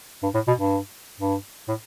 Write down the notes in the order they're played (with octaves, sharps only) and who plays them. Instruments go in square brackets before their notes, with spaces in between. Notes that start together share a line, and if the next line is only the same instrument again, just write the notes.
[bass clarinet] G2
A2
B2
G2
G2
A2